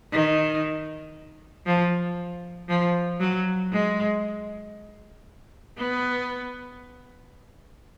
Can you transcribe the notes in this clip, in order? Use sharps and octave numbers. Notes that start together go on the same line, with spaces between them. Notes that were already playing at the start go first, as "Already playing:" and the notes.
D#3
F3
F3
F#3
G#3
B3